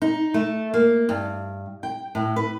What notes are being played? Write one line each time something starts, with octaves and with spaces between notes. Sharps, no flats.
D#4
A3
A#3
G2
G5
A2
B4